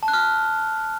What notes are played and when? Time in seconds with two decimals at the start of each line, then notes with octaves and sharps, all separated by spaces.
0.03 A5
0.08 F#6
0.13 F6
0.19 F#6